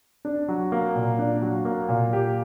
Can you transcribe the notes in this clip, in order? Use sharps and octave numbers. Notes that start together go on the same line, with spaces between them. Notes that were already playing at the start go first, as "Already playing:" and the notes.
D4
F#3
A#3
A#2
D4
F#3
A#3
A#2
G4